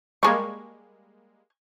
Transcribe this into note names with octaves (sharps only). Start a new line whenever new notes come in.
G3 G#3 A#3 G#5 C#6